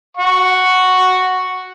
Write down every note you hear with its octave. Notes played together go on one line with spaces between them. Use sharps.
F#5 C#6